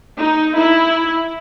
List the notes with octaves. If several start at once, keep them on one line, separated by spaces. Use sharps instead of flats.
D#4
E4